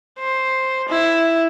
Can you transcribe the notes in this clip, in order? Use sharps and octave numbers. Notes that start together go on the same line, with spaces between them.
C5
E4